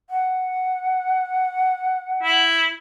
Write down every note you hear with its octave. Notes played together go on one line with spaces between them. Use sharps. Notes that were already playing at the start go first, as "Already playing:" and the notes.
F#5
E4